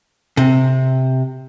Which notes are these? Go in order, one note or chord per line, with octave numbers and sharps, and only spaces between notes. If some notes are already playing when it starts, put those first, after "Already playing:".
C3